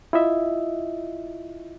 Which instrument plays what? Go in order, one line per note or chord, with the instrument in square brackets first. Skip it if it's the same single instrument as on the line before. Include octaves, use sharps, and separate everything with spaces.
[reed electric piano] E4 F4 D#5 E5